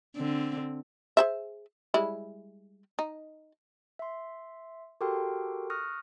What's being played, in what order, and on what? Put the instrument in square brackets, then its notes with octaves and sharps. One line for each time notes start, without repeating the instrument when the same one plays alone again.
[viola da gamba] D3 C4
[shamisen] G#4 C5 E5
G3 G#3 E4
D#4
[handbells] E5 C6
F#4 G4 A4 A#4 G5 C6
C#6 D#6 F6 F#6 A#6